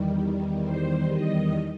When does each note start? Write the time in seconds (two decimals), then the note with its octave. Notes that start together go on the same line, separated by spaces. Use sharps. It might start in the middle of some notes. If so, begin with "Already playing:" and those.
Already playing: E2 D#3 G3
0.64 C5
1.10 D#5